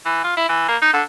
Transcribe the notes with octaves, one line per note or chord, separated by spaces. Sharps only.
E3
F4
E4
E3
A#3
D#4
D3